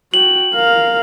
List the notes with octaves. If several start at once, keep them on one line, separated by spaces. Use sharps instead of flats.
F#4 G5 F#7
A#4 F5